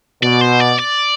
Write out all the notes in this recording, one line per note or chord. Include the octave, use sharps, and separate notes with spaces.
B2 D5
C5
D5
D5